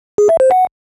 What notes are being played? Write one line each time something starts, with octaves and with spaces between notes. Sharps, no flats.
G#4
E5
C5
F#5